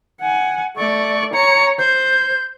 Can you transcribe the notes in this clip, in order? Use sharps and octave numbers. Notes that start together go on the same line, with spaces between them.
F#5 G#5
A3 D5 C#6
C#5 A#5 C#7
C5 G6